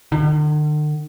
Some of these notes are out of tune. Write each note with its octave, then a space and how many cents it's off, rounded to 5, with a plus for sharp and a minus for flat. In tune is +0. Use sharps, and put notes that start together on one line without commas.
D3 +45